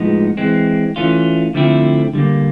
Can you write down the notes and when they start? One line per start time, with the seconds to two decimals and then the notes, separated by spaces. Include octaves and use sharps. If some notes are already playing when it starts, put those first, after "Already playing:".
Already playing: A2 F3 G#3 B3 D#4
0.37 E3 G#3 C4
0.96 E3 A3 C#4 F4
1.54 D3 F3 A3 C4 E4
2.14 D3 G3 A#3